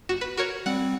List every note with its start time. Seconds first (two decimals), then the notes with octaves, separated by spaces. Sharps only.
0.09 G1 F#4 E7
0.21 B4
0.37 F#4 A#4 C#5
0.66 G3 C4 F#5